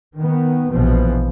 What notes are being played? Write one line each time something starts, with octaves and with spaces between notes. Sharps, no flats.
D#3 B3
A#1 B2 E3 F3